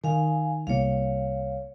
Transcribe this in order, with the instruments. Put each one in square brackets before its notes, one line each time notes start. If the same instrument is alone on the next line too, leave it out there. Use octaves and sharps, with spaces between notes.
[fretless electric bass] D#3 [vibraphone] F5 G#5
[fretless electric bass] C2 C3 A#3 [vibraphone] C#5 F5